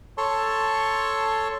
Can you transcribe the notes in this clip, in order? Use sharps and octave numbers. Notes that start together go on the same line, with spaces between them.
A4 C#5 A5 C6 C#6